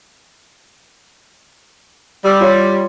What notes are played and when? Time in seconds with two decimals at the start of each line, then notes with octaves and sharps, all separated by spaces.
2.24 G3 E6
2.40 F4 G4 C#5